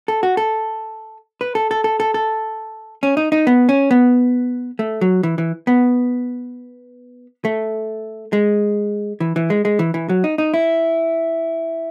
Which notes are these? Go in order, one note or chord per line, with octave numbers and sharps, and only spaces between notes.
A4
F#4
A4
B4
A4
A4
A4
A4
A4
C#4
D#4
D#4
B3
C#4
B3
A3
F#3
E3
E3
B3
A3
G#3
E3
E3
G#3
G#3
E3
E3
F#3
D#4
D#4
E4